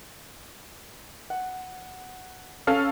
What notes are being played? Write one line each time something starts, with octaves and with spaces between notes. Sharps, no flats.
F#5
C#4 A4 F5 F6